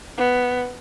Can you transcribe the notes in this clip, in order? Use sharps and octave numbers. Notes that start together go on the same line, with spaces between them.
B3